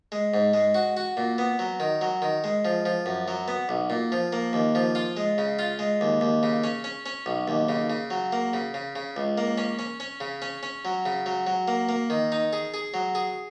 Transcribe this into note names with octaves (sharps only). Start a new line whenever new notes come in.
G#3
G#2
G#3
F#4
F#4
A#2
B3
F#3
D#3
F#3
D#3
G#3
F3
F3
F#2
F#3
B3
B1
A#2
F3
A#3
D#2
F3
F4
G#3
C#3
F4
G#3
D#2
D#2
C#3
C#4
C#4
C#4
B1
D#2
C#3
C#3
F#3
A#3
C#3
C#3
C#3
C#2
A#3
C#4
C#4
C#4
C#3
C#4
C#4
F#3
C#3
F#3
F#3
A#3
A#3
D#3
D#4
G#4
G#4
F#3
G#4